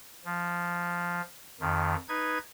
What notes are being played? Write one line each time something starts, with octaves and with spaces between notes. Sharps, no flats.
F3
F2 D#3
D#4 B4 G#6